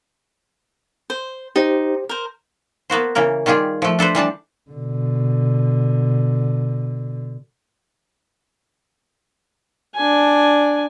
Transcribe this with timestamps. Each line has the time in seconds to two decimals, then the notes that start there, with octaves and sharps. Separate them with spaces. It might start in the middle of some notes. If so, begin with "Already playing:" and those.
1.10 C5
1.56 D#4 G4 C5
2.09 A#4 C5
2.90 A#3 B3 F#4 C5
3.15 C#3 E3 A#3 A#4
3.46 D#3 G3 F4 G4 G#4
3.82 F3 A3
3.99 D4 A4 B4 C5
4.15 E3 G3 D4 A5
4.71 B2 D3
9.96 D4 G#5